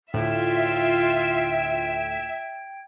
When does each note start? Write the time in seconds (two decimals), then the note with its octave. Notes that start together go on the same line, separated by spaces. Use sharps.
0.14 D2 A2 F4 E5 G5 G#6